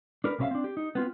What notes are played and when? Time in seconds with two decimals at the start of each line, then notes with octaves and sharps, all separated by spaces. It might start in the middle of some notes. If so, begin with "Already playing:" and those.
0.24 D4 A#4 B4
0.38 B1 C3 C#4 B4 E5 F5
0.51 C4 D4
0.64 G4
0.77 D#4
0.95 B3 C4 F4